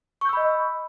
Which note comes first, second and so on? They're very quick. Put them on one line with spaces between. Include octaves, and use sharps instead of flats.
C#6 G6 E6 B5 D#5